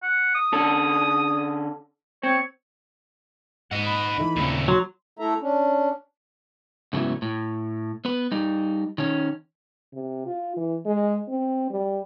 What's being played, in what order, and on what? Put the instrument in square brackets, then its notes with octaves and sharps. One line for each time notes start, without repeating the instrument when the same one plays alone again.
[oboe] F#5
D#6
[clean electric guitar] D3 C#4 A4
[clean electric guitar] C4 [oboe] C#5
[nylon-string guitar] G#2 [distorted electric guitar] D#5 F#5
[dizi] B5
[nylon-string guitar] E3 A3 D#4
[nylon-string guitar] D#2 C#3 C4 [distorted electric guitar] A#2 A3
[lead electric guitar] F#3 [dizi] C6
[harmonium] A3 E4 A4 E5 A#5
C#4 D4
[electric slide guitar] G#2 C#3 F#3 A3 B3 E4
A2
B3 B4
G3 D#4
D#3 C#4
[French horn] C3
F4
E3
G#3
C4
G3